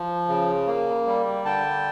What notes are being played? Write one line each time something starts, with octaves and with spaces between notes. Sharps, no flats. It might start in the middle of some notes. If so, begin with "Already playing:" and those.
Already playing: F3
C#3
A#3
G3
D3 G5 A5